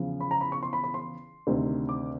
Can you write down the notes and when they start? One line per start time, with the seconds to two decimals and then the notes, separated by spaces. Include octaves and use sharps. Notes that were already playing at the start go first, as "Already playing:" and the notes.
Already playing: E2 C#3 F3
0.21 B5
0.31 A#5
0.41 B5
0.52 C#6
0.63 C6
0.73 B5
0.84 B5
0.94 C6
1.47 D2 C3 D#3
1.89 D6